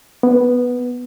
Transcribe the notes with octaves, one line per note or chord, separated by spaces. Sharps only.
B3